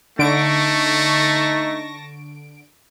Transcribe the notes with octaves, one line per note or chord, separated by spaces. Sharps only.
D3 A3 D#4 A5 C#6 A#6 D7